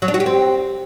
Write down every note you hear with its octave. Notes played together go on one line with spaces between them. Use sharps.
F#3
D4
F#4
G4
C4